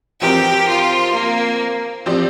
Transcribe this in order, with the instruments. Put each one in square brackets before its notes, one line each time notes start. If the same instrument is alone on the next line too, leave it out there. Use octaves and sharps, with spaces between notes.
[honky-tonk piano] F3 C4 A#4 [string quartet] G4
[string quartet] F4
A#3
[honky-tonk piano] F3 C4 G4 D5